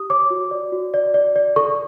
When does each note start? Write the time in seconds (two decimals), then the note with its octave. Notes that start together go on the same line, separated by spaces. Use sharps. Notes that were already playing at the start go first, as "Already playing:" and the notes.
Already playing: G4 D#6
0.10 C#5 D6
0.30 F#4
0.51 D5
0.72 F#4
0.94 D5
1.14 D5
1.36 D5
1.56 A4 C#6